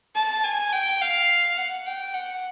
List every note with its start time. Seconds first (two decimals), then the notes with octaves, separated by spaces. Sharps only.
0.15 A5
0.44 G#5
0.72 G5
1.01 F5
1.58 F#5
1.86 G5
2.14 F#5